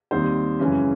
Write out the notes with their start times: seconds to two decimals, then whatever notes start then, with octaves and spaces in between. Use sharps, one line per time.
0.11 D#2 D#3 G3 C4 C5
0.59 F#2 C#3 E3 G#3 C#4